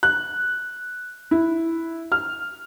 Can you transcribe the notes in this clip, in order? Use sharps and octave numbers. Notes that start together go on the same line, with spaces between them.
F#6
E4
F6